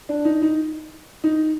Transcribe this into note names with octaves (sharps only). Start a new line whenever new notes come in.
D4
D#4
D#4
D#4